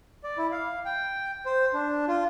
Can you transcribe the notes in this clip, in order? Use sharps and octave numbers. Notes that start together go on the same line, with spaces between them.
D5
E4
F5
G5
C5
D4
F4